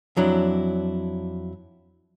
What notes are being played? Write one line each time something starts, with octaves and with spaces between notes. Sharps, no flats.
F2 F#3 D4 E4